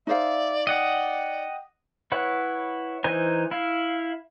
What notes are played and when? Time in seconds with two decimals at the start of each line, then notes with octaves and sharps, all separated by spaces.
0.07 D#4 C5 D5 E5 F5
0.67 D5 D#5 F#5 G5
2.12 E4 B4 C#5 F#5
3.04 E3 D#4 C5 G#5 A#5
3.51 E4 F5